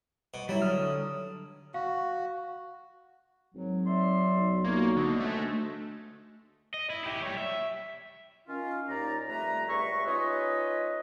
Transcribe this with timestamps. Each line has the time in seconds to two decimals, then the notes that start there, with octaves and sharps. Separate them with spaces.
0.34 B2
0.49 F#3 G3 E4
0.62 D3 D#6 F6
1.74 F#4 F5
3.54 G#1 F#3
3.87 D5 E5 C6
4.35 B1
4.64 B1 A#3 D#4 F4 C#5
4.96 D3 F#4 D#5
5.20 D2 G#3 A3
6.74 D#5
6.90 E4
7.04 E4 G4
7.22 G3 C#5
7.37 E5
8.48 D#3 C#4 F4
8.88 D#2 D#4 D5 A#5
9.28 F2 G3 A3 B4 A#5
9.68 C#2 G3 B4 E5 C#6
10.06 C#4 D#4 F4 B4 C#5 D#5